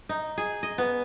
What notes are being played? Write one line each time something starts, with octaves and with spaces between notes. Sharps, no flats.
D#4
G#4
D#5
B3